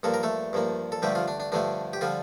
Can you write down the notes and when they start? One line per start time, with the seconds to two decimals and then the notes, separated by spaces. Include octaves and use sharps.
0.03 G2 F3 A#3 A4
0.14 A#4
0.23 A3 A4
0.53 G2 F3 A#3
0.92 A4
1.02 G2 D3 F3 G3 A3 G4
1.15 F3 F4
1.28 D4
1.40 D4
1.52 G2 D3 F3 A3 D4
1.93 G4
2.01 D3 F3 G3 F4